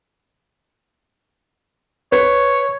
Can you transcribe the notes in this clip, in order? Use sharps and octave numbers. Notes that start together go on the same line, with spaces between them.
B4 C#5